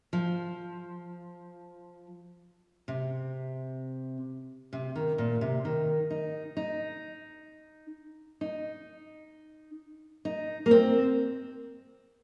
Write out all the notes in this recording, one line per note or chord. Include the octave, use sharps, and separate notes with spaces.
F3
C3
C3
D#3
A#2
C3
D#3
D#4
D#4
D#4
D#4
A#3
C4